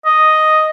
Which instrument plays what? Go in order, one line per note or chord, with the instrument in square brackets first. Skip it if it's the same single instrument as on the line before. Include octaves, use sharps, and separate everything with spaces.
[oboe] D#5